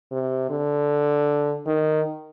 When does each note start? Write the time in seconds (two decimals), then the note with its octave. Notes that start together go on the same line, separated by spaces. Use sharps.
0.12 C3
0.50 D3
1.67 D#3